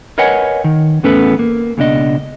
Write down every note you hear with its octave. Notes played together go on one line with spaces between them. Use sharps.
A#4 B4 C#5 D#5 F#5 G#5
D#3
E2 A2 B3 C#4 A4 B4
A#3
C#2 B2 D4 D#5